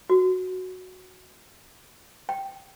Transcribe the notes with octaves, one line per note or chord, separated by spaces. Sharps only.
F#4
G5